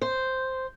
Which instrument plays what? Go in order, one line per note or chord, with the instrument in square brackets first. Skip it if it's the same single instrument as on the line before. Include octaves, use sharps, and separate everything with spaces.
[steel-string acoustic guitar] C5